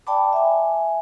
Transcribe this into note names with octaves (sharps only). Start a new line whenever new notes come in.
D5 G5 A5 B5 D6
E5 G#5